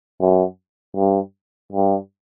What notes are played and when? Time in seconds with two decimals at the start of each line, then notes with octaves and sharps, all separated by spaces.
0.21 F#2
0.97 G2
1.72 G2